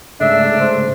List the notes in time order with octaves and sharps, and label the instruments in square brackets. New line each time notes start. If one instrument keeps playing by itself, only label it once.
[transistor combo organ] G#2 C#3 A3 [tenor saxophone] D4 [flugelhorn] E5
[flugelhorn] C5